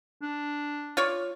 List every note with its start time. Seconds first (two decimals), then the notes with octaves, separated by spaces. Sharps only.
0.22 D4
0.97 F4 C#5 D5